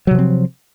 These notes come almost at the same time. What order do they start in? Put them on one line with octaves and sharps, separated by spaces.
F#3 C3 F3 C4